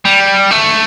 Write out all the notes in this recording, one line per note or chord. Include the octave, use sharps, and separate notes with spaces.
G3
A3